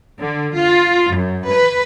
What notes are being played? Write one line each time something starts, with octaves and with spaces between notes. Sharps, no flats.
D3
F4
F#2
B4